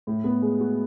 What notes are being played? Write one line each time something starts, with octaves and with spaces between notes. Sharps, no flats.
A2
B3
G#3
F#4